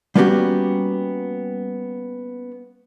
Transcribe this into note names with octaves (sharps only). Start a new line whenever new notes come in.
G3 A#3 B3 C#4 F#4 G4